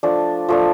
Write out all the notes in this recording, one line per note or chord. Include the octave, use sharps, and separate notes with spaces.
F3 A3 D4
F3 A3 D4